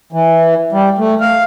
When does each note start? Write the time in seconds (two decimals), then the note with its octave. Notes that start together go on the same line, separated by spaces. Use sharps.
0.13 E3
0.72 G3
0.99 A3
1.20 F5